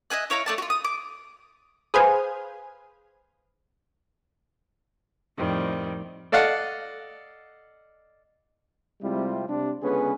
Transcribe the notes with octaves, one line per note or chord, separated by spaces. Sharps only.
D#5 E5 G#5 F#6
E4 C#5 F5 A#5
A3 D4 A5
F4 F#4
D#6
D6
G#4 B4 C5 F5 G#5
F2 A2 D#3 G3 C4
A4 D5 D#5 F5 F#5
C3 G3 G#3 C4 E4 F4
C3 D4
C#2 D3 B3 C#4 G#4 B4